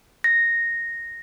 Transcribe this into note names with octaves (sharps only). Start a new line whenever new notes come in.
A#6